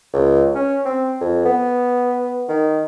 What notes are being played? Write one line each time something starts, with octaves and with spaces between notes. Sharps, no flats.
C#2
C#4
C4
F2
B3
D#3